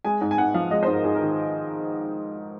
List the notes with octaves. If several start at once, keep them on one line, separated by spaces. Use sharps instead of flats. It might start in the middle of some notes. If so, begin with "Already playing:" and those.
G#3 G#5
G#2
G#5
G#2 F#5
F3 F5
G#3 D#5
G#2 C5
A#4
G#2 G#4
A#4
D#3